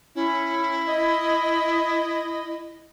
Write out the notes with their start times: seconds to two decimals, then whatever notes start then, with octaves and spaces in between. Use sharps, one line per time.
0.15 C#4 E4
0.87 D#5